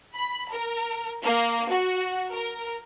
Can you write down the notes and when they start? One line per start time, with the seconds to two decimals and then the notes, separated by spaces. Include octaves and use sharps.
0.15 B5
0.51 A#4
1.23 A#3
1.71 F#4
2.32 A#4